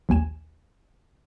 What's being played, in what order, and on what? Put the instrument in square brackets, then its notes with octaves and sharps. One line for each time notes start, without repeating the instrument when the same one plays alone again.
[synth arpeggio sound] A#1 D#2 G#5 E7